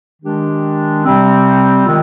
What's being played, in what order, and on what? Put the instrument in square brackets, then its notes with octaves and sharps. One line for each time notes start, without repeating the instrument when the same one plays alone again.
[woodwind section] D#3 G#3 D4 G4
C3 G3 C4
D#3 G#3 C4 F4